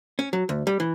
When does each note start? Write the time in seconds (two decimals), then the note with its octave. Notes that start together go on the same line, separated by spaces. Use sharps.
0.19 C#4
0.33 F#3
0.49 D2
0.67 G3
0.80 E3